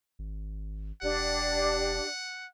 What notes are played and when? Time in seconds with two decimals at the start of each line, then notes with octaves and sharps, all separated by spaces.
0.19 G#1
1.02 E1 D4 G4 D5 F#5